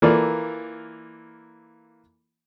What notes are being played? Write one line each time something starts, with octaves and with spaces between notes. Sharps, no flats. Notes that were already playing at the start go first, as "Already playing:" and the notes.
E3 A#3 F4 A4 A#4 D5